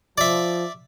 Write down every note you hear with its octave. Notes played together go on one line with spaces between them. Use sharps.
F3 D5 E5